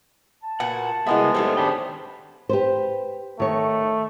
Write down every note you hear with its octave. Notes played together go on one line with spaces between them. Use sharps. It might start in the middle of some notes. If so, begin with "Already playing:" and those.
A5
A#2 B3 F#4 F#5
G#3 B3 E4 F#4 G#4 A#4 D#5 E5
G3 A3 G4 A4 C5 C#5
D4 G#4 C5 G5 B5
G4 B4 C5
D#3 A3 C#5